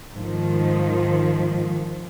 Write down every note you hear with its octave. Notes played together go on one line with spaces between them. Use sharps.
G#2 D#3 F3